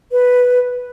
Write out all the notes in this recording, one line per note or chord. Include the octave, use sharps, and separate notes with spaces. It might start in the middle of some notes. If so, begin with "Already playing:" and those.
B4